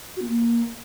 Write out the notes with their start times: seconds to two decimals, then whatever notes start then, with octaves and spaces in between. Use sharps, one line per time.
0.16 F#4
0.22 B3
0.27 A#3